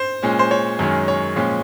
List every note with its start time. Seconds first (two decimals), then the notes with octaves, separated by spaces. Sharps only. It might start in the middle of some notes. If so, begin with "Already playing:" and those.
Already playing: C5
0.23 A#2 G#3 C#4
0.39 C5
0.51 C#5
0.79 F#2 D#3 G#3 C#4
1.08 C#5
1.36 A#2 F3 G#3 C#4